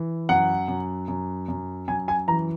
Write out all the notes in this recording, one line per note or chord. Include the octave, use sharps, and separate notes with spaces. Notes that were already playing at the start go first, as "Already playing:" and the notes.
Already playing: E3
F#2 F#5
F#2
F#2
F#2
F#2 G#5
G#5
E3 A#5